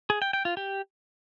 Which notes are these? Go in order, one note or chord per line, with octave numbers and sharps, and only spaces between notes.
G#4
G5
G5
F4
G4